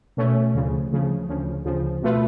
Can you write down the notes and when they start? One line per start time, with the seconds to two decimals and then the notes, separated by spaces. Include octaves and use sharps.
0.17 B2 A3 C#4
0.54 D2 C#3 F3
0.91 D2 C#3 F3
1.29 D2 C#3 F3
1.65 D2 C#3 F3
2.02 B2 A3 F4 B4